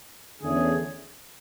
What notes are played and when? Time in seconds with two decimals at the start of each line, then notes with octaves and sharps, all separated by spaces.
0.41 E2 D3 A3 C#4 G#4